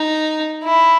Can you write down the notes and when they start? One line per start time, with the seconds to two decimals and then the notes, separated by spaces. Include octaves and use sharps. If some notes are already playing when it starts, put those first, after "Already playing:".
Already playing: D#4
0.64 E4